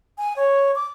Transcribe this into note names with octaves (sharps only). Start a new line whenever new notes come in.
G#5
C#5
D6